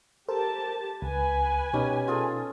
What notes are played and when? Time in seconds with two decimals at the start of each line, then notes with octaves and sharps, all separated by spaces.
0.29 G4 A4 A#4 C5 A5
1.02 C#2 B4 G#5
1.73 B2 G3 C#4 D#4
2.08 F4 G#4 A4